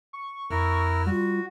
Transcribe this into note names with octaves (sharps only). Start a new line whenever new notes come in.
C#6
F2 E4 A#4
G3 F4 F#4